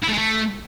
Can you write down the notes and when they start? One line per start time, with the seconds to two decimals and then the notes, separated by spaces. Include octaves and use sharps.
0.03 E4
0.08 A3
0.13 G#3
0.18 A3